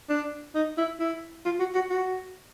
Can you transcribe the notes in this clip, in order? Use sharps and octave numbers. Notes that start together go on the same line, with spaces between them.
D4
D#4
E4
E4
F4
F#4
F#4
F#4